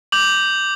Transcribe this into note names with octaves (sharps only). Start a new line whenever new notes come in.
D6 G6 F#7